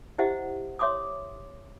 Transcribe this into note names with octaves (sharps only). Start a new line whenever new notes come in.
E4 G4 C5 D#5 E5 F#5
C#5 E5 C6 D6 D#6